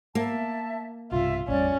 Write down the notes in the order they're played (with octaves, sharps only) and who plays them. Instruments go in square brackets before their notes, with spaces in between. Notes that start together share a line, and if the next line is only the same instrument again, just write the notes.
[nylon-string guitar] A#3 [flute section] E5 A5
[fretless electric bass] B1 G2 C3 [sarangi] F4 [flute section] E5
[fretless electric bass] A1 F2 G3 [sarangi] C#4 [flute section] D5